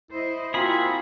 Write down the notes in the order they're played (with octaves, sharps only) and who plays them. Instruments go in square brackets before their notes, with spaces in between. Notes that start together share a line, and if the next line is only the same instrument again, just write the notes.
[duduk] E4 [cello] C5 D#5
[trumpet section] A#3 C4 F4 [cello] F#4 [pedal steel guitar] G#4 B5